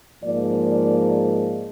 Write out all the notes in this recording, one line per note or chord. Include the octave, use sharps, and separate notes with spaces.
G#2 F3 A#3 D5
D5